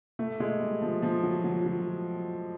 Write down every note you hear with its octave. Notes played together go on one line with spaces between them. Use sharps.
A3
G#3
G3
F3
F3
F#3
F#3
F#3